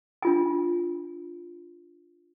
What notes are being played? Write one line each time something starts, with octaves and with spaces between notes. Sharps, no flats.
D4 F4 G#5